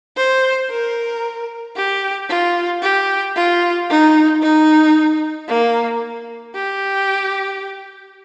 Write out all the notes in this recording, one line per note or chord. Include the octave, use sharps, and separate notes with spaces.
C5
A#4
G4
F4
G4
F4
D#4
D#4
A#3
G4